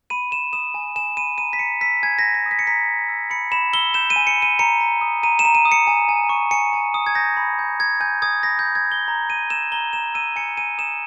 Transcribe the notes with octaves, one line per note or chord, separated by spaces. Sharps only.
B5 D#7
B5 E7
D#6 E7
G#5
G#5 E7
B5 D#7
A#5 D#7
B6
A#5 C#7
E6 B6
G#5 G#6
A#6
G#5
B6
D#6
B6
C#7
A#5 B6
A#5
E6
B5 C#7
B5 E7
E6 G7
G6 E7
D#7
G#5
C#7
B5 D#7
A#5 C#7
A#5
D#6
A#5 D#7
E7
A#5
D#7
D#6
C#7
G#5
G#5
C#6
G#5 C#7
G#5
D#6
G#6
G6 A#6
B5
G6
G#5 G#6
G#5 G6
D#6 G#6
B5 A#6
G6
B5
G#6
D#6
G7
A#5
A#5 D#7
E6 E7
A#5 G7
A#5 E7
E6 D#7
G#5 C#7
G#5 D#7
D#6 E7